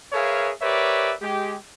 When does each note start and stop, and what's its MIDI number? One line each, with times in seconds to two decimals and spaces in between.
0.13 0.51 68
0.13 0.51 70
0.13 0.51 71
0.13 0.51 73
0.13 0.51 76
0.13 0.51 77
0.61 1.13 67
0.61 1.13 70
0.61 1.13 71
0.61 1.13 73
0.61 1.13 74
0.61 1.13 76
1.21 1.57 56
1.21 1.57 67